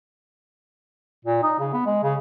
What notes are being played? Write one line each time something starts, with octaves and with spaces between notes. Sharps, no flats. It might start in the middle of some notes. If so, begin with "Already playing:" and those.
A#2
D#4
C#3
B3
G#3
C#3